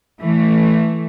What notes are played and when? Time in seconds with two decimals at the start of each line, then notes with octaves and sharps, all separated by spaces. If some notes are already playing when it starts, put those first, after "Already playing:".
0.21 E3 A3